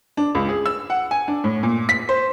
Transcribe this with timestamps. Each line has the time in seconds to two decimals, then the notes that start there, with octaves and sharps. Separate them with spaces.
0.17 D4
0.35 C#2
0.49 G#4
0.66 E6
0.90 F#5
1.11 G#5
1.28 D4
1.44 A2
1.63 A#2
1.89 B6
2.09 C5